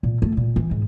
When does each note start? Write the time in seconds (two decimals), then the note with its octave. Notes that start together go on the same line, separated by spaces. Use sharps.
0.03 A#2
0.22 A3
0.37 A#2
0.56 E3
0.71 G#2